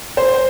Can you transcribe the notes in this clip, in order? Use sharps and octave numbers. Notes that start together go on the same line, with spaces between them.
C5